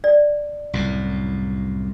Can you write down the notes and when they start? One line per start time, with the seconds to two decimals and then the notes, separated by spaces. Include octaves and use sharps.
0.04 D5
0.73 C2 F#2 A2